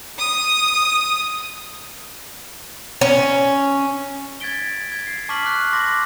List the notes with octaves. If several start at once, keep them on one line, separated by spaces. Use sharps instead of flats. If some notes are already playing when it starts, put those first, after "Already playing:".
D#6
C#4
G#6 A6 B6 D7 G7
G#6
C7
A5 C#6 D6 F6 B6 F#7
F#6
C6 D6 A#6